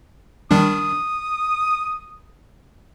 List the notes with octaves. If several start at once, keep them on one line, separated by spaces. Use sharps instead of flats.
D#3 G3 D4 D#6